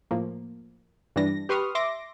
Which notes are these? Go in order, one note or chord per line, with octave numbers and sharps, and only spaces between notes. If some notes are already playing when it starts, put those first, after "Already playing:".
A2 F3 A#3
G2 E3 G3 D4 A#6
G4 B4 C6 C#6 D#6 F6
E5 C6 D6 A#6